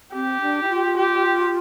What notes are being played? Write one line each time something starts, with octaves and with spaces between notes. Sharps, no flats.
C4 G4
D4
E4
F4
G4